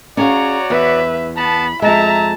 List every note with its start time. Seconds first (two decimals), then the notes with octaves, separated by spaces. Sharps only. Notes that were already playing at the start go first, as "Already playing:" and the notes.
0.17 C#4 F#4 G#4 C#5 D5 F5 A#5
0.70 E2 B4 E5
1.37 B3 A5 B5
1.82 F2 G#3 E5 A5 A#5